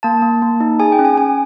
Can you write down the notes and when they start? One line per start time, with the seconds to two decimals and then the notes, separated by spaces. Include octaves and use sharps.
0.03 A#3 A5
0.22 A#3
0.42 A#3
0.60 D#4
0.80 G#4 G#5
0.92 G5
0.99 C#4
1.05 G#5
1.17 C#4 G#5